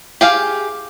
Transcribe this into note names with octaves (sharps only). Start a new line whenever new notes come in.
G4 G#4 F5